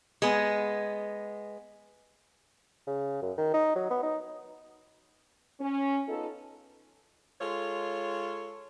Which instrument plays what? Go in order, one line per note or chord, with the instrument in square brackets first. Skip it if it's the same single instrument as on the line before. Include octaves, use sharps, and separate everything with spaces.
[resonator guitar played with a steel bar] G#3 B3
[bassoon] C#3
F#2
D#3
D#4
F#3
B3
D#4
[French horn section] C#4
B3 D#4 F4 A4
[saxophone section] G#3 F4 A4 C#5